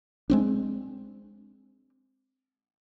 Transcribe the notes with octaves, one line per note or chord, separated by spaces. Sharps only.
G#3 C4 D4